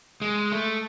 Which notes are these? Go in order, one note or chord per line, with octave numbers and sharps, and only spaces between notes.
G#3
A3